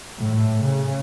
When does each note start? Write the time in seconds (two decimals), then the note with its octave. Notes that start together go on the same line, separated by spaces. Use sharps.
0.18 A2
0.62 C#3